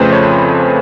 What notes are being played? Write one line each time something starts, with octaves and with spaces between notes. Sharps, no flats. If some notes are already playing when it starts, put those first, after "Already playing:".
Already playing: F2 C#3 F3 A3 B4 C5
C#5